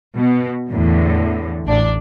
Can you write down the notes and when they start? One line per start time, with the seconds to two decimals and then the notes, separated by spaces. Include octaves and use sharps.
0.16 B2
0.69 E2 A2 D3
1.66 A1 D4